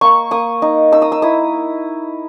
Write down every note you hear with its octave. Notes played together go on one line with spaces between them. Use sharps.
A#3 C#6
A#3 D#6
D#4
D#4 E6
D#6
E6
E4 D#6